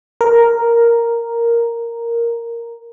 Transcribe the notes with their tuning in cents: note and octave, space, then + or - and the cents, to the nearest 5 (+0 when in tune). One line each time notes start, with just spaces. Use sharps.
A#4 +0